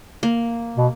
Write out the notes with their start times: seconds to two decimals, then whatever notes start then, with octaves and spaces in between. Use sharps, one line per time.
0.23 A#3
0.77 B2